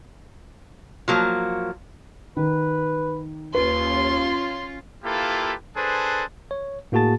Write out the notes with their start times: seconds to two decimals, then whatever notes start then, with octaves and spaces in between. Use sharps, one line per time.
1.08 F3 F#3 A#3
2.37 D#3 B4
3.55 D#2 C#4 F4 B4 C6
5.04 A#3 E4 F4 G4 A4 B4
5.76 D4 G#4 A4 B4 C5
6.51 C#5
6.92 A2 A#3 F#4 G#4 A5 A6